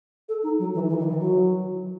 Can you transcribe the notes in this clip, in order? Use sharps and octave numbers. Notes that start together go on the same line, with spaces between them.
A4
D#4
F#3
E3
E3
D#3
E3
F#3